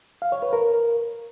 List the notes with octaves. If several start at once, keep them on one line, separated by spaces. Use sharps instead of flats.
F5
C#5
B4
A#4